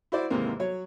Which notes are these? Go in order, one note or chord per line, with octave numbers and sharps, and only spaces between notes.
E4 F#4 C5 D5
D#2 G#2 C3 E3 A#3
F#3 C#5